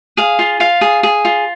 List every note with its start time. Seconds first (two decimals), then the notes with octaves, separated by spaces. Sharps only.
0.17 G#4 F5
0.39 F4
0.60 F4 F5
0.81 G#4
1.03 G#4
1.25 F4